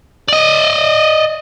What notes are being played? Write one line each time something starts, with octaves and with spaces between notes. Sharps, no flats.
D5 D#5